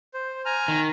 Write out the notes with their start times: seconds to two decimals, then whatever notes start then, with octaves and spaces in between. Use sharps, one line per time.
0.14 C5
0.45 G#5 A#5 F6
0.68 D#3